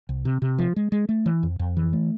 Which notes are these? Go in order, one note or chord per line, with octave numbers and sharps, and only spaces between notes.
C2
C3
C3
F3
G#3
G#3
A3
E3
F2
F2
E3
A3